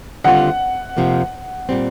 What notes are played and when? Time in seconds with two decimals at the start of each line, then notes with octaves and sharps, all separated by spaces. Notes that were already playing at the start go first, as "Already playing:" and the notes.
0.24 D#2 D3 G3 C4 F4 F#5
0.97 F2 C3 F3 A#3
1.69 A#2 G3 C4